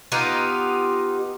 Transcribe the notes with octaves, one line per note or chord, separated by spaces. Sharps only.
B3 D#4 F4 G4